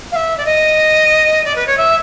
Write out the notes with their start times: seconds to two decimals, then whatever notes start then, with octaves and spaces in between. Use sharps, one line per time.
0.12 F5
0.16 E5
0.37 D5
0.45 D#5
1.45 D5
1.56 B4
1.67 C#5
1.77 E5